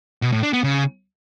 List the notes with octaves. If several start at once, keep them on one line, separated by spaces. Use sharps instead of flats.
B2
A2
D4
B3
C#3